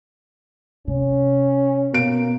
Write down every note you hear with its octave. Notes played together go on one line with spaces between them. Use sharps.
C3 C#4
B2 A#3 D7